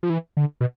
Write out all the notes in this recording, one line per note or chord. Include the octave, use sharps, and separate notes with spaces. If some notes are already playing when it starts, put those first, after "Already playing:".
F3
E3
D3
B2